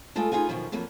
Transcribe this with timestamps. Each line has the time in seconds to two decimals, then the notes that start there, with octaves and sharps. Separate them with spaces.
0.16 G#3 A3 B3 F4 A4
0.32 B3 D#4 F4 G#4 F#5 G#5
0.49 F#2 B2 D#3 F3
0.72 F2 F#3 A#3 B3 B4